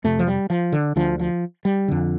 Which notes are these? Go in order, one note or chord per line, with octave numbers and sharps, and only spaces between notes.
F2 C3 A3
F3
G3
F3
D3
D2 D3 F3
F3
G3
F2 D3